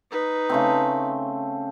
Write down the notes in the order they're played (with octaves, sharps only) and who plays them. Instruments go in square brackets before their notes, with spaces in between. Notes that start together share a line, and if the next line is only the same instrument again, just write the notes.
[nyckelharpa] D#4 B4
[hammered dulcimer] C#3 A3 C4